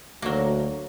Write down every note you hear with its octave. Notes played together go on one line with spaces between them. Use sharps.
D2 F#3 A#3